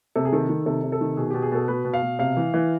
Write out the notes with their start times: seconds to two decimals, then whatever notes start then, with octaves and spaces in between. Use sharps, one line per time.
0.15 C3 A4
0.25 G#4
0.32 D#3 A4
0.49 D#3
0.66 C3 A4
0.84 C3
0.92 A4
1.01 D#3
1.17 B2 G#4
1.30 B2 G4
1.42 G#4
1.52 B2 A4
1.68 B2 B4
1.85 B2
1.94 F5
2.02 B2
2.19 C3 F5
2.37 E3
2.54 E3